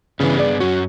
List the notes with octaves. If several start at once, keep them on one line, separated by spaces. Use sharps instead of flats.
G2 C#3 E3 B3 D4
G#4 D5
F#2 C#4 F#4